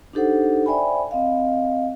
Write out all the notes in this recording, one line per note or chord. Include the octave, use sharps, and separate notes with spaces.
D4 D#4 G4 A4 C5 F#5
C5 D5 E5 G5 G#5 B5
C4 D#5 F5